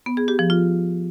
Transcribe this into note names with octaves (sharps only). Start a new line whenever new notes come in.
B3
G#4
G4
F3
F4